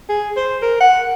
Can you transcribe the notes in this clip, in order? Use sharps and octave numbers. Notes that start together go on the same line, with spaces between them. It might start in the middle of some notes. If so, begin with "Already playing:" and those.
G#4
C5
A#4
F#5